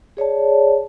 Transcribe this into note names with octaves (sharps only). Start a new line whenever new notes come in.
G#4 C#5 D5 A5